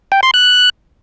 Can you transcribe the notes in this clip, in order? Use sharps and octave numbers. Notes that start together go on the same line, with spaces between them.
G5
C6
F#6